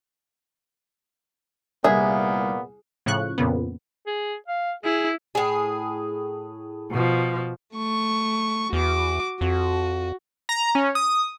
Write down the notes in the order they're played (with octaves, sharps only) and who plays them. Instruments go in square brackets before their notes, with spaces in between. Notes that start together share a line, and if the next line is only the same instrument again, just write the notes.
[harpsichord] C2 [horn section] A#2 A#3 B3 [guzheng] G#4 [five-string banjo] E5
[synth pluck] A2 C#3 F3 C#6 F#6
F2 A#2 C#3 B3
[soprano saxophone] G#4
F5
[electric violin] E4 [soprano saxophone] G#4
[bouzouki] A2 G#4
[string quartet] B2 F3
[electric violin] A3 C#6
[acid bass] E2 [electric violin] F#4 D6
[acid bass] F2 [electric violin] F#4
[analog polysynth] A#5
C#4
D#6